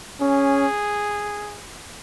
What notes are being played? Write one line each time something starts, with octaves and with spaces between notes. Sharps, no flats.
C#4 G#4